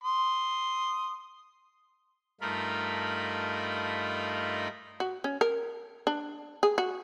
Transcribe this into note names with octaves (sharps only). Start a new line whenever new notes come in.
C6 D#6
G2 A3 D#4 F4 A#4 B5
F#4
C#4
A#4
D4
G#4
F#4